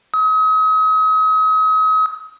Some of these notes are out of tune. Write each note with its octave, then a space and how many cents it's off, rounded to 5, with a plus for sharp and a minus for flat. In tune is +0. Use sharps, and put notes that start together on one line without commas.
D#6 +40